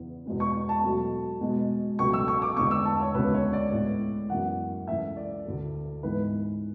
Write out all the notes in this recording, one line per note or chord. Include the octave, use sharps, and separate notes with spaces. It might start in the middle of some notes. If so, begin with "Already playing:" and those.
Already playing: E2 C#3 E3 B3
E2 B2 G#3 B3
C#6
A5
B2 F#3 A3
B2 G#3 B3
C#2 B2 F#3 A3 C#6
E6
C#6
D6
E2 D3 G#3 B3 C#6
E6
A5
C#5
D2 C#3 G#3 B3 B4
C#5
D5
A2 G#3 B3
F#2 E3 B3 F#5
C#2 C#3 E3 A3 E5
D5
D2 D3 A3
G#2 E3 G#3 B3 B4